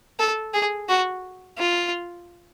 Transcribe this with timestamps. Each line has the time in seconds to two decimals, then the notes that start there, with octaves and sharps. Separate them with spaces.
0.19 A4
0.53 G#4
0.89 F#4
1.58 F4